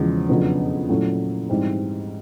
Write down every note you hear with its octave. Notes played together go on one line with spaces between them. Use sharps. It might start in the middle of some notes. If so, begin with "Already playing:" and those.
Already playing: E2 C#3 F3 G#3
F2 C#3 F#3 B3 D4
A#2 F#3 A3 C#4 E4
G#2 E3 G3 C4